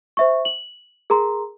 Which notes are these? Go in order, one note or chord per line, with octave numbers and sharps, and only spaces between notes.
C5 E5 C#6
F#7
G#4 A#4 A#5 C6